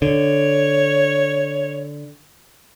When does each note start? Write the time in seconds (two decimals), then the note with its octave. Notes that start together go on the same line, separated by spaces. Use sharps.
0.02 D3 C#5